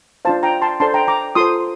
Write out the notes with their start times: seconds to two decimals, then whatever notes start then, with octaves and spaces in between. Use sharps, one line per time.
0.25 D4 F4 C5 F5 A5
0.43 G5 A#5
0.62 A5 C6
0.80 D4 A4 C5 A5 C6
0.94 G5 A#5
1.08 A#5 D6
1.35 F4 A4 C5 C6 D#6